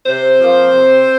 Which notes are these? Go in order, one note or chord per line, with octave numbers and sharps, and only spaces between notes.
C3 C4 C5
F3 A#3
C3